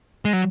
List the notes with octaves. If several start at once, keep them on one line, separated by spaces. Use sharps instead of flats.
G#3
F#3